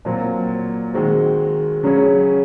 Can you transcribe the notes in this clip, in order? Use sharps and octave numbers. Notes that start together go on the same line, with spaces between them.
A#2 F#3 C4
D#3 G#3 C4 F#4
C#3 F#3 C#4 G#4 C#5